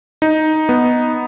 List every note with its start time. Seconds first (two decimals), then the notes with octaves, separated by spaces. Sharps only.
0.22 D#4
0.69 B3